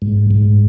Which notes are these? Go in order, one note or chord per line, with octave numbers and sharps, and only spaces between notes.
G#2
G#2